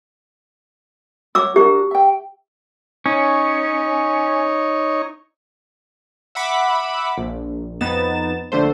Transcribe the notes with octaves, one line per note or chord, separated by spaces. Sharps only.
F#4 C#5 D6 E6
D4 F#4 G4 A#4
E5 G5
C#4 D#4 C#5
E5 F#5 B5 D6
A#1
F2 B3 D#4 A6 E7
A#1 D3 A3 C5